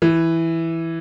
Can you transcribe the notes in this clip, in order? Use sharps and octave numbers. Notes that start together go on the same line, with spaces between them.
E3